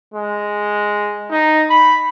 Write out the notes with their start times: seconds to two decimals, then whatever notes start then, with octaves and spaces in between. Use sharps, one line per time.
0.14 G#3
1.31 D#4
1.70 B5